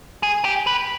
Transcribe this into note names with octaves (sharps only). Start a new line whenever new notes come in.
G#4
G4
B4